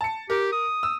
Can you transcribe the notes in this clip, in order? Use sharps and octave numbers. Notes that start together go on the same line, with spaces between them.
A5 C#7
G4 A#4
D#6
E6